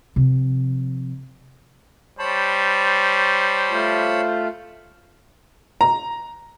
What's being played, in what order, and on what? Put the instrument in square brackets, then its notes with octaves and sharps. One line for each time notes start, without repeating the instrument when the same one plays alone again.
[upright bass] C3 F3
[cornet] G3 [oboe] C5 [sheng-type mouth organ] C#5 A5 B5
[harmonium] A3 F4
[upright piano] A#5